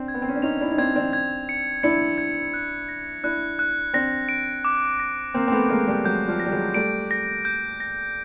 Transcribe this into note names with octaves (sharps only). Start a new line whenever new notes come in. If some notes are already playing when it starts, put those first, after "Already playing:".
Already playing: C4 D4
G#6
B3
C4
C#4
D4
C#4 D#4 F7
D4 E4
D#4
C4 D4 G#6
C4 D4
G#6
C#7
D4 E4 C#7
G#6
F#6
A#6
D4 E4 F#6
F#6
C4 D4 A#6
D7
D6
A#6
A#3 C4 G6
C4
A3 B3
G#3 A#3 D6
G3 A3
F#3 G#3 G6
F3 G3
A#6
G3
F#3 G#3
G3 A3 D7
A#6
G6
A#6